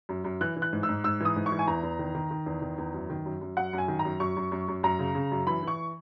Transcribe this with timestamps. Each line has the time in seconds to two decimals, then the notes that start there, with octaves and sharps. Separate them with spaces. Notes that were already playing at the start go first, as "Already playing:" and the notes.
0.09 F#2
0.24 F#2
0.41 E3 F#6
0.56 E3
0.62 F#6
0.73 G#2
0.83 E6
0.89 G#2
1.04 G#2 E6
1.20 E3 D#6
1.36 G#2
1.46 C#6
1.52 E3
1.59 G#5
1.67 E2 A#5
1.83 E2
1.99 D#3
2.15 D#3
2.31 D#3
2.46 E2
2.62 D#3
2.78 E2
2.94 F#2
3.10 D#3
3.25 F#2
3.41 F#2
3.57 F#2 F#5
3.73 F#2
3.78 G#5
3.88 D#3
3.99 A#5
4.05 F#2
4.20 F#2 C#6
4.37 F#2
4.52 F#2
4.68 F#2
4.83 F#2 A#5
4.99 C#3
5.15 C#3
5.32 F#2
5.47 E3 B5
5.63 E3 C#6